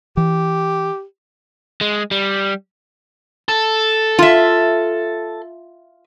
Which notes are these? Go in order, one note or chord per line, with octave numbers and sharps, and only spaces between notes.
E3 G4
G#3
G3
A4
F4 E5